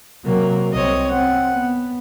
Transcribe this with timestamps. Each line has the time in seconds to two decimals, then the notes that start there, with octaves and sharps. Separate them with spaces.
0.25 C3 F#3 A#3 A#4
0.72 C2 C4 C#5 D#5
1.11 C4 F#5
1.54 B3